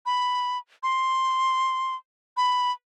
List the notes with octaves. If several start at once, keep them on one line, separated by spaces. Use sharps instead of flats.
B5
C6
B5